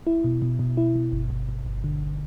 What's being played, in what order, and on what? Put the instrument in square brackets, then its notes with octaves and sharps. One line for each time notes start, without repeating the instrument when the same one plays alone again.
[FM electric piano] E4
B2
B2
B2
E4
B2
G1
G1
G1
G1
D3
G1